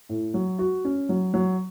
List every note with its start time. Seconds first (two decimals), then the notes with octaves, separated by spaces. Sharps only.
0.09 A2
0.34 F#3
0.59 F#4
0.85 C#4
1.09 F#3
1.34 F#3